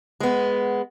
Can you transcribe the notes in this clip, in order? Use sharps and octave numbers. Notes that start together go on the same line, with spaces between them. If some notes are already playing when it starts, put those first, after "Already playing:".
G#3 B3